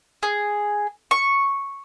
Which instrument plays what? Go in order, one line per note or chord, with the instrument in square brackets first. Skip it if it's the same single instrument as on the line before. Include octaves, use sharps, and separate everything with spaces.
[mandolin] G#4
C#6